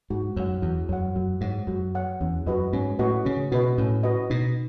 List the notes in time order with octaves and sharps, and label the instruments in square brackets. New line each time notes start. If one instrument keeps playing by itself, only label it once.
[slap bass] G#2 [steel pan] F#4
[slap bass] F#2 [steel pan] C#5 F#5
[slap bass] E2 [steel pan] F#4
[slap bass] F#2 [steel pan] C#5 F#5
[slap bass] F#2 [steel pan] F#4
[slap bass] G#2 [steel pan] C#5 F#5
[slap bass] F#2 [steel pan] F#4
[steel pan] C#5 F#5
[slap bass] E2 [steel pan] C#4
[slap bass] F#2 [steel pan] F#4 B4 D#5
[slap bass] G#2 [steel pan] C#4
[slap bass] A2 [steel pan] F#4 B4 D#5
[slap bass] C#3 [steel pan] C#4
[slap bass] B2 [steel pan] F#4 B4 D#5
[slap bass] A2 [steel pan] C#4
[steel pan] F#4 B4 D#5
[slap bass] B2 [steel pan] D#4